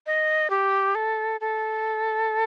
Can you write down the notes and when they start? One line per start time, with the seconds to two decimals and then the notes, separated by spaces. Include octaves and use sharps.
0.06 D#5
0.50 G4
0.95 A4
1.41 A4